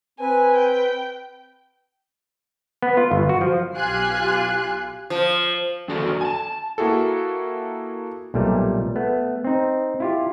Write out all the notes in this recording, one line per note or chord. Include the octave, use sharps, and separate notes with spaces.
C4 B4 G#5
G5
B3
F4
G1
F#4
F3
B1 F4 G4 G#5 F#6 C7
F3
F2 D#3 D4 F#4 A4 D5
G#5 A5
A#3 E4 F#4 G#4 A4
B1 A#2 G3 A3
A3 B3
C4 D#4
E4 F4 G4